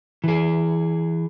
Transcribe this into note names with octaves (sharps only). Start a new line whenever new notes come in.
E3 G#4